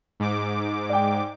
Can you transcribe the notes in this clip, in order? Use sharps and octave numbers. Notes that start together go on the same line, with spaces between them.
G#2 D6
D5 G5